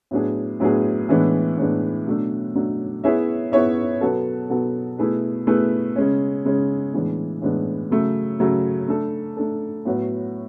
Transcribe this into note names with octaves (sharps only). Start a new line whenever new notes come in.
A2 F#3 B3 D4 G#4
A2 F#3 B3 D4 G#4
A2 E3 G#3 B3 D4
A2 E3 G#3 B3 D4
B2 F#3 A3 D4
B2 F#3 A3 D4
B3 E4 G#4 C#5 E5
B3 E4 G#4 C#5 E5
B2 F#3 B3 F#4 A4
B2 F#3 B3 F#4 A4
B2 A3 E4 G#4 B4
B2 A3 E4 G#4 B4
C#3 G#3 C#4
C#3 G#3 C#4
A2 E3 G#3 B3 D4
A2 E3 G#3 B3 D4
C#3 F#3 A3
C#3 F#3 A3
A3 D4 A4
A3 D4 A4
A2 F#3 B3 F#4 C#5